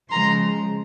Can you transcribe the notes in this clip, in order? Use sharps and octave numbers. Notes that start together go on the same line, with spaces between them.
C#3 F3 G#3 A#5 C6